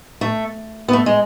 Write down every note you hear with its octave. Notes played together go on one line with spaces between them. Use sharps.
A3
B3
A3
G#3